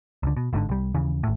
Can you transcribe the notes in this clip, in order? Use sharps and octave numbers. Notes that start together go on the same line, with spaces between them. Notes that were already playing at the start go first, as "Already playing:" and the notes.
C#2 D3
B2
G1 G#2 B2 D3
C2 G3
D#2 C#3 E3
G#1 A2